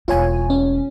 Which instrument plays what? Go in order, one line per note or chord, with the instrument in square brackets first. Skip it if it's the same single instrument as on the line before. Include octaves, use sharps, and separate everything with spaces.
[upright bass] E1 C4 [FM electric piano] F4 C#5 G#5
[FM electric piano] C#4